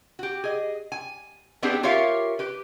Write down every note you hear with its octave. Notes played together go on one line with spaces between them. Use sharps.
F#4 G4
G#4 D#5
G#5
B3 C4 D4 D#4 G4 G#4
F4 G4 A#4 C#5 E5 F5
G4 B4